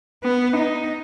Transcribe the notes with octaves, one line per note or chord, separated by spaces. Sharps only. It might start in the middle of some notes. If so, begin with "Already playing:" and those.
B3
D#4